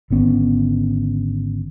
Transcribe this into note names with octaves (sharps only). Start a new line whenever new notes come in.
G#1 D3 B3 C#4